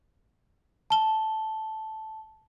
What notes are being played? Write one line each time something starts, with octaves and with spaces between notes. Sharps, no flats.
A5 G7